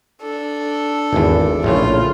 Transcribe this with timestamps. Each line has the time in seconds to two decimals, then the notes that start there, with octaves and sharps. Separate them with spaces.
0.22 D4 A4
1.13 G#1 E2
1.64 A#1 A2 C#3 F4